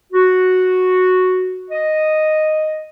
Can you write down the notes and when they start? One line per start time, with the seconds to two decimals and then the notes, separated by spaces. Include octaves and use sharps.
0.13 F#4
1.71 D#5